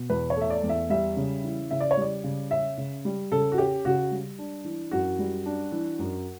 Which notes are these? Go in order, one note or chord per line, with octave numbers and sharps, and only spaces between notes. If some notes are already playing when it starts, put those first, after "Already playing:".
Already playing: B2
E2 B4
C#5
A3 E5
D5
E2
E5
G3 E5
C#3
E3
C#3 E5
D5
C#5
G3 D5
C#3
C#4 E5
C#3
G3
C#3 A4
F#4
C#4 G4
C#3 F#4
G3
D4
E3
F#2 F#4
G3
D4
E3
F#2